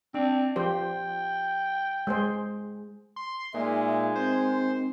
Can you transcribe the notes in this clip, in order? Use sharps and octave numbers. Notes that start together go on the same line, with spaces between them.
C4 D4
F3 G4 C5 G5
G#3 G#4 C5
C6
A#2 G#3 D#4 A#4 E5
C4 C5